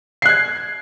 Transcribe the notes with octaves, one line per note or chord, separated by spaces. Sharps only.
F#6 G#6 C7